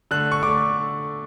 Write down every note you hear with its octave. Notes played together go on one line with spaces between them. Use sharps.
D3 A3 F#6
C#6
D3 A3 D6